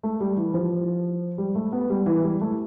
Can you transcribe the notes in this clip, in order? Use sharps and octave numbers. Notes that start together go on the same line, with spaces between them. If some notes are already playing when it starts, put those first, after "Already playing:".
A3
G3
E3
F3
G3
A3
B3
G3
E3
G3
A3